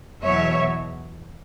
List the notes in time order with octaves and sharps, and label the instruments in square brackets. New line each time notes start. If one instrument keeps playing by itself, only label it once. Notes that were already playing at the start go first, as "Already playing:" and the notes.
[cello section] E2 B2 F#3 C#5 E5